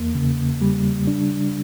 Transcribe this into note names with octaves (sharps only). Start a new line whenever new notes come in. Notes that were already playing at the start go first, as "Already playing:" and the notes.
Already playing: E2 A#3
C#3
G3
D4